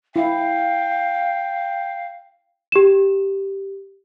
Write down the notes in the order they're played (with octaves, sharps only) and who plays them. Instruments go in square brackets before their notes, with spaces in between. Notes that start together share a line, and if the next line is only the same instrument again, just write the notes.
[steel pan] E4 [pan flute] F5 [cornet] G5
[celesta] G4 E7